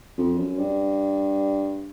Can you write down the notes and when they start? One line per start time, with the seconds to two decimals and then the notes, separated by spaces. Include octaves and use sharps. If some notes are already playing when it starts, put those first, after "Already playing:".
0.18 F2
0.38 F#2
0.59 G2